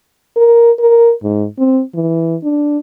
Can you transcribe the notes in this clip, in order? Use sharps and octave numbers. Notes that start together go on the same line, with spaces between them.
A#4
A#4
G#2
C4
E3
D4